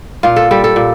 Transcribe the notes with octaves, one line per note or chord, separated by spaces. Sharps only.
A#2 F4
A4
G3 A4
A4
A#2